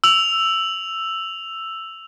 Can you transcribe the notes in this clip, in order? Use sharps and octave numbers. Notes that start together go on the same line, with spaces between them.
E6 F7